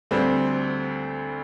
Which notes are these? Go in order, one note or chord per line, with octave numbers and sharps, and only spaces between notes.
D2 D3 G3 C4